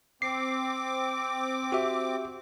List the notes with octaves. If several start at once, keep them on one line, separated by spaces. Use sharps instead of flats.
C4 D6 C7
F#4 G4 E5